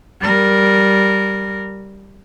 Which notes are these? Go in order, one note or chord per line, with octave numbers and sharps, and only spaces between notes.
G3 A#4